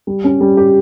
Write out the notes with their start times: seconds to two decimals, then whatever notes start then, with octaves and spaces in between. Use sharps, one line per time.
0.07 G3
0.24 C#4
0.41 G3
0.57 G4